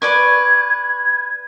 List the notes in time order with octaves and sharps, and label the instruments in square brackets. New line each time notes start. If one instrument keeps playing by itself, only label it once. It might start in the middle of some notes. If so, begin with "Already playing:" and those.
[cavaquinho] B4 D5 C#6 [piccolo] G#6